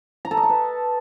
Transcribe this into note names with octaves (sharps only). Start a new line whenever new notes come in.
A#5
A4
D#5
A4
B4